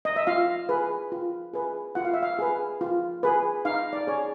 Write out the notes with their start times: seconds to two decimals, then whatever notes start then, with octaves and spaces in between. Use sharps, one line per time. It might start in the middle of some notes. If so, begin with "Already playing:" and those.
0.05 D#5
0.16 E5
0.27 F4 F5
0.69 G#4 B4
1.12 F4
1.53 G#4 B4
1.95 F4 F#5
2.05 F5
2.14 E5
2.23 F5
2.39 G#4 B4
2.81 F4
3.23 G#4 B4
3.65 D#4 F5
3.93 D5
4.07 G#4 C#5